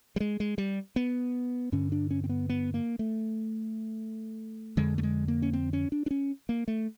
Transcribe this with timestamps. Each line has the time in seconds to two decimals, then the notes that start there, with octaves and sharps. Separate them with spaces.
0.16 G3
0.20 G#3
0.40 G#3
0.58 G3
0.96 B3
1.72 G2 D3 C#4
1.92 D4
2.11 C#4
2.24 C4
2.29 B3
2.49 B3
2.74 A#3
2.99 A3
4.77 F2 D3 G#3
4.98 A3
5.03 G#3
5.28 A#3
5.42 C#4
5.53 C4
5.73 C#4
5.92 D4
6.06 D4
6.11 C#4
6.49 A#3
6.68 A3